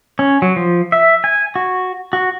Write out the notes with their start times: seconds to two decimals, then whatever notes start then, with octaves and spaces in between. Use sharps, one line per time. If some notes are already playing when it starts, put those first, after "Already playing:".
0.19 C#4
0.42 F#3
0.56 F3
0.92 E5
1.24 G#5
1.56 F#4
2.13 F#4